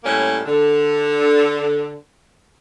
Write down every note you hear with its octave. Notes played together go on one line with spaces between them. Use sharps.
A2 G3 A#3 C#4
D3